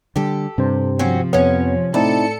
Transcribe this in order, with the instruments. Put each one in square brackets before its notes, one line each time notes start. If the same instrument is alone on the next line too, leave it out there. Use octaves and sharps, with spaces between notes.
[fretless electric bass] D3 G3 [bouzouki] G4 A4
[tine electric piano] G2 C5 [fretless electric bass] C3
[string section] F3 [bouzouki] C4 C#4 F#4
[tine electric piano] F2 B3 [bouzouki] C#4 C#5
[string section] A2 A4 C#7 [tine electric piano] C4 D#4 E4 [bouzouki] D5